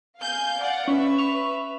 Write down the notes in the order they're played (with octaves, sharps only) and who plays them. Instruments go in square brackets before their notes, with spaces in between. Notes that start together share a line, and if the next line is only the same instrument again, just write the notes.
[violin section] F5 G#5 G6
D5 F5 F#5
[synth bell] C#4 [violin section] B4 E5
[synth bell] C#6 F7